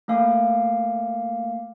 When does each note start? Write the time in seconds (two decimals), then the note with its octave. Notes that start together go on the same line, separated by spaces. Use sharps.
0.08 A3 A#3 F5 G#5 D6